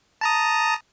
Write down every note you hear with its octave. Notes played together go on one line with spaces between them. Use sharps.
A5 A#5 D#6